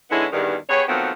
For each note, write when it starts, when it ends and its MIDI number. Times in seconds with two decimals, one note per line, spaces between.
0.11 0.26 50
0.11 0.26 56
0.11 0.26 59
0.11 0.26 61
0.11 0.26 63
0.11 0.26 64
0.32 0.55 40
0.32 0.55 43
0.32 0.55 51
0.69 0.83 59
0.69 0.83 67
0.69 0.83 68
0.69 0.83 73
0.88 1.11 51
0.88 1.11 53
0.88 1.11 54
0.88 1.11 57
0.88 1.11 59
0.88 1.11 60